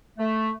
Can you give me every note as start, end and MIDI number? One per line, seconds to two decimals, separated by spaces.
0.19 0.51 57